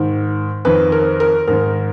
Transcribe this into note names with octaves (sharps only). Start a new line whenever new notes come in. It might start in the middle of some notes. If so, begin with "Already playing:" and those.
Already playing: G#2 D#3
F2 D#3 B4
A#4
A#4
G#2 D#3 A#4